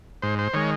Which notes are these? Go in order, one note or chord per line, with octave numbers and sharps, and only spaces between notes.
G#2 C5
C5
D#3 G#3 C#5